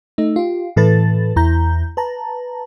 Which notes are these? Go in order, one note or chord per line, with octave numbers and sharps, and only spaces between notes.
A3 D#4
F4 G4
A2 E3 A4 B4 A6
E2 E4 A#5 G6
B4 A5 A#5